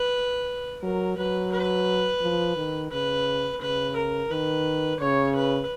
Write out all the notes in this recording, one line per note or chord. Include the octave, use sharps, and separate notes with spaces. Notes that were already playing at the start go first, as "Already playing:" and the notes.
Already playing: B4
F#3 A#4
F#3 B4
B4
F3
D#3
C#3 B4
C#3 B4
A#4
D#3 B4
C#3 C#5
B4